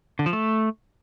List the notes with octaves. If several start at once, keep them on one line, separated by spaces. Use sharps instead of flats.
D3
F3
A3